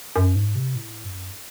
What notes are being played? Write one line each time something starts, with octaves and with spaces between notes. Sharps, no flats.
F#2
G#2
C3
A2
F#2